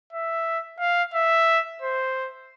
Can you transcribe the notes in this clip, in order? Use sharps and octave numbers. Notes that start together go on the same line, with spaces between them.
E5
F5
E5
C5